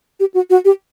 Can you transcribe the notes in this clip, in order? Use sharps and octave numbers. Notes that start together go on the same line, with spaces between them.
G4
F#4
F#4
G4